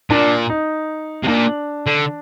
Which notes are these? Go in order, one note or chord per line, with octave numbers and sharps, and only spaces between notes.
A#2 D4
D#4
C3
A#2 D4
D3